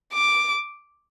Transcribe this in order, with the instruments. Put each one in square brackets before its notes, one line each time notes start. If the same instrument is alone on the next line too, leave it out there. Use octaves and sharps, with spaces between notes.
[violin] D6